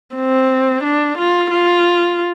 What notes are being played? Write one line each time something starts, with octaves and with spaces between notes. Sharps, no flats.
C4
D4
F4
F4